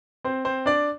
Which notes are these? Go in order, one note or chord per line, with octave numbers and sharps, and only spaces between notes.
C4 C5
C4 C5
D4 D5